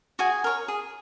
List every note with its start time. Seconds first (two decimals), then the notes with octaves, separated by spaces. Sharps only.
0.19 F#4 G#4 G#5
0.44 A#4 C#5
0.68 G#4